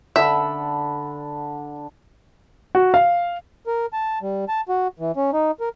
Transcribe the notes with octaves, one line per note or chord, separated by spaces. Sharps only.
D3 E5 B5
F#4
F5
A#4
A5
G3
A5
F#4
E3
C#4
D#4
A#4